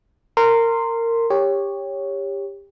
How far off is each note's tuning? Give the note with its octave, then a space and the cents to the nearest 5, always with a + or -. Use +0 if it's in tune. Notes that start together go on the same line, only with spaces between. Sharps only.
A#4 -20 C6 +0
G4 +20 C#5 +0